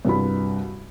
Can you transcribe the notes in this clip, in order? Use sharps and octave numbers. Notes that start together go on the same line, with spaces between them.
C2 G2 F#4 B5